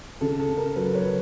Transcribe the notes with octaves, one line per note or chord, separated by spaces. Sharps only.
C#3 A4
A4
C#3
A#4
F#3 A4 B4
B4 C#5
F#3